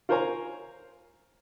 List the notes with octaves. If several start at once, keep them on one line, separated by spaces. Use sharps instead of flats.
F4 A#4 C5 C#5 G#5 A#5